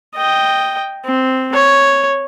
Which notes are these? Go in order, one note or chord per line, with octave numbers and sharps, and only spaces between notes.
D#5 G5
C4
C#5